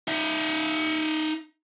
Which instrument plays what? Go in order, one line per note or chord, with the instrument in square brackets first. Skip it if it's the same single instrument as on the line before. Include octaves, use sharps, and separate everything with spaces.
[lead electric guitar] D#4 E5